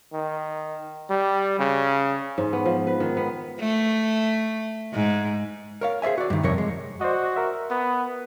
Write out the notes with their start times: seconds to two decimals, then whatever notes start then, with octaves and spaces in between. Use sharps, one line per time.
0.13 D#3
1.10 G3
1.59 C#3
2.38 G#2
2.53 B3
2.65 F3
2.87 B4
3.00 D#3
3.17 B3
3.60 A3
4.93 G#2
5.81 A#4 C#5 F5
6.02 G#4 C5 D5 E5 G#5
6.18 F#4 D5
6.30 G2 D#3
6.43 F2 C3 A#4 C#5
6.58 G#3
7.01 F#4 C5 D5 D#5
7.36 A#4 E5
7.71 B3